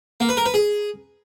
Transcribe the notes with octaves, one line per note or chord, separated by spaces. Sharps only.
A#3
B4
A#4
B4
G#4